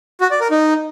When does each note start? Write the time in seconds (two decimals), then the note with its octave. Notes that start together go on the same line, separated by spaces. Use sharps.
0.21 F#4
0.31 D5
0.41 A#4
0.50 D#4